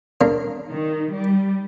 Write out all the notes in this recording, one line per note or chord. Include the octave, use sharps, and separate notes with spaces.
C#3 A#3 D4
D#3
G3